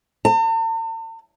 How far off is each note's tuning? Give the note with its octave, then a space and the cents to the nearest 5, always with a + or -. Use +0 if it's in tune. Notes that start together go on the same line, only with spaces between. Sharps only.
A5 +45